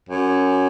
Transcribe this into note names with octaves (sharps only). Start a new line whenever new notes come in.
F#2